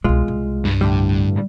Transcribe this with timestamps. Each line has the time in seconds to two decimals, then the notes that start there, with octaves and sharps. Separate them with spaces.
0.04 C2 B2 G#3 F4
0.28 C2
0.65 G2
0.81 A2 D3 G3